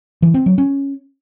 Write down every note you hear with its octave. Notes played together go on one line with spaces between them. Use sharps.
E3
C4
F#3
C#4